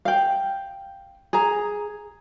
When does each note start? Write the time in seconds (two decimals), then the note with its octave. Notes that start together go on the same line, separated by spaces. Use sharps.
0.05 F5 G5
1.33 G#4 A#5